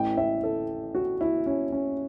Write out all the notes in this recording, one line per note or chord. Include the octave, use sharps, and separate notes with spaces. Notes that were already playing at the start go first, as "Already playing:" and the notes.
Already playing: A1 A2 E3 G5
E5
A4
F#4
E4
C#4
C#4